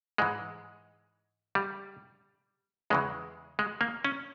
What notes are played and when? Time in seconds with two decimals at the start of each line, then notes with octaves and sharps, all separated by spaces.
0.18 G#2 E3 G#3
1.55 G3
2.90 E2 C#3 E3 G#3
3.59 G#3
3.81 A#3
4.05 C#4